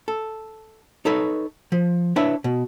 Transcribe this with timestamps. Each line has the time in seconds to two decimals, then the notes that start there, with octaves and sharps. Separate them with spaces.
0.08 A4
1.05 D#4 A4 B4 C#5
1.72 F3
2.16 D4 E4 B4 C#5 E5
2.44 B2